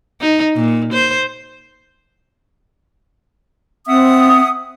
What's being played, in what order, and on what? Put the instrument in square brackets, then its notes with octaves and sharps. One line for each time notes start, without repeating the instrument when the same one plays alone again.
[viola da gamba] D#4
A#2
C5
[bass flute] C4 [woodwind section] E5 F#5 D#6